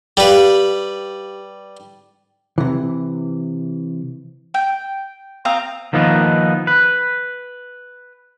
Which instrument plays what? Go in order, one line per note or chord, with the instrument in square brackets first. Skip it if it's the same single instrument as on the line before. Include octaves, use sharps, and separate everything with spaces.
[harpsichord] G3 B4 [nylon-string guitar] G4 F5
[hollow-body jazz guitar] C3 E3
[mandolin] G5
C4 F5 A#5 D#6
[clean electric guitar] D#3 F3 A#3 B3 D#4
B4